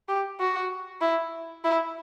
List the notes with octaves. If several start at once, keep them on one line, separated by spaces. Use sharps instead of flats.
G4
F#4
E4
E4